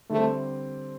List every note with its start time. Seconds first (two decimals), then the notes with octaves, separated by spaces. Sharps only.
0.10 D3 G3 A3 C4